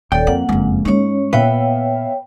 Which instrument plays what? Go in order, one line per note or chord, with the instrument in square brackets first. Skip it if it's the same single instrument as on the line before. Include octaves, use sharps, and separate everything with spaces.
[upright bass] D#1 [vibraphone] A4 C#5 D5 [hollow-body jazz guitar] G5
[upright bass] F2 [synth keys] A#3 [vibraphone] F#5
[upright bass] F#1 F2 [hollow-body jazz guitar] G#2
[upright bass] G#3 D#4 [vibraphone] C#4 C#5
[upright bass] A#2 [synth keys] B3 E5 F5 [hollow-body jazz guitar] B4 [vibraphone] C#5 G5